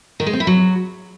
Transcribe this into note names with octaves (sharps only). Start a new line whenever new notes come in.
D#3
G#3
C4
E4
F#3